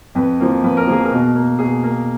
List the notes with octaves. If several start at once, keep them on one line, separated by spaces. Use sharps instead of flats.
F2 B4
F3 A#3
F2 B4
A#4
F3 A#3 G#4
A#4
B2
A#3
B2 G#4
A#3